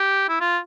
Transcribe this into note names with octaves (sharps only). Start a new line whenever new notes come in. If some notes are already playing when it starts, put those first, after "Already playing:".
Already playing: G4
E4
F4